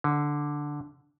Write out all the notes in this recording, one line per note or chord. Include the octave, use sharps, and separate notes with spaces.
D3